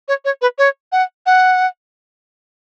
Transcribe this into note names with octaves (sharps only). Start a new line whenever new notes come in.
C#5
C#5
B4
C#5
F#5
F#5